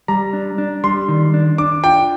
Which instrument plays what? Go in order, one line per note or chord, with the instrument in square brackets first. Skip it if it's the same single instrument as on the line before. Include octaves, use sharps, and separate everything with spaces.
[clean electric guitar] G3 [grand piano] A#5
[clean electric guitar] D4
D4
[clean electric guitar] G3 [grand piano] C6
[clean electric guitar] D#3
D4
[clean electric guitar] D4 [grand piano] D6
[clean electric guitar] F4 [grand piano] G5